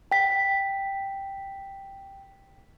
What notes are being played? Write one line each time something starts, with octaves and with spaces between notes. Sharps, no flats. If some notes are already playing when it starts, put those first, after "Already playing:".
G5 B6